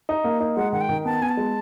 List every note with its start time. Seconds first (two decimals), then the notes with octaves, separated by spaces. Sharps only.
0.09 D#4
0.24 A#3
0.40 D#4
0.56 G#3 F#5
0.72 D#3 F#5
0.81 G5
0.89 D#3
1.05 B3 A5
1.21 B3 G#5
1.29 A5
1.37 G#3